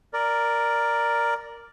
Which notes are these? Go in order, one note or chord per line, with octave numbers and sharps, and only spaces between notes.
A#4 D5